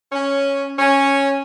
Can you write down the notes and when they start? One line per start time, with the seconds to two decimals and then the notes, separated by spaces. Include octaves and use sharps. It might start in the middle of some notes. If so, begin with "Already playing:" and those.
0.12 C#4
0.79 C#4